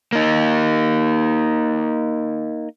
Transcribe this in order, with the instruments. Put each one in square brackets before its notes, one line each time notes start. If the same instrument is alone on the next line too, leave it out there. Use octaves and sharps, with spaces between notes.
[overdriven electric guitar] A#3 D#4